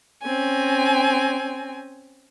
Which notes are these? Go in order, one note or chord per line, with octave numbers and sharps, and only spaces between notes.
C4 C#4 G#5